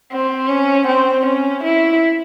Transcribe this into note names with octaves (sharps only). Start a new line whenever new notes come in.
C4
C#4
C4
C#4
E4